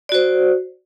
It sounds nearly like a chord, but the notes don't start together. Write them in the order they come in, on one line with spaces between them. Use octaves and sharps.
D5 F#4 C5